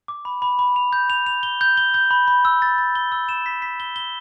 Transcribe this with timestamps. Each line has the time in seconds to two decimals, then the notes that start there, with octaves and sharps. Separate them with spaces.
0.08 D6
0.25 B5
0.42 B5
0.59 B5
0.76 F7
0.93 G6
1.10 F7
1.26 F7
1.43 G7
1.61 G6
1.77 G7
1.94 G6
2.11 B5
2.28 B5
2.45 E6
2.62 A6
2.78 A6
2.95 G7
3.12 E6
3.29 E7
3.46 B6
3.62 B6
3.80 G7
3.96 G7